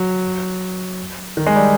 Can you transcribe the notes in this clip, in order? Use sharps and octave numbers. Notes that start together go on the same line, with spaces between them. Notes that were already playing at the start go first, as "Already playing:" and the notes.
Already playing: F#3
D#3
G#3
G3